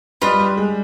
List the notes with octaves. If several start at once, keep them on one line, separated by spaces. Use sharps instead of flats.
G3 F4 B4 D#5 B5
G3
G#3